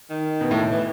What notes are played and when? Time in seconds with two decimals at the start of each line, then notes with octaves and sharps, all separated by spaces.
0.10 D#3
0.41 B2
0.51 A2
0.71 E3